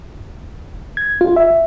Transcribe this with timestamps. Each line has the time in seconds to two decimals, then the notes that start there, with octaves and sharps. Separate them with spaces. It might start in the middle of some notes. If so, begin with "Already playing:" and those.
0.97 G#6
1.21 F4
1.36 E5